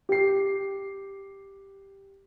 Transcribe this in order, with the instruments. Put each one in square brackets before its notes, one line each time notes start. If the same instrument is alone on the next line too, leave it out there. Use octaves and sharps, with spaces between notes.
[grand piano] G4 C7